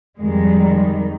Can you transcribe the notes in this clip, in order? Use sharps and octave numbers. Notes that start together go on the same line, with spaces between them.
F2 D#3 G3 G#3